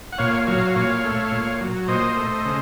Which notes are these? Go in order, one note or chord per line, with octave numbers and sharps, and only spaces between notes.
F#5
A#2 C#5 F5
F#3 C#5 F5
A#2 C#5 F5
A3
A#2
F#3
A#2 C5 D#5
A3
C#3